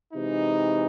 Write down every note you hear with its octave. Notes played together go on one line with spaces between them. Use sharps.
C3 E3 G#3 D#4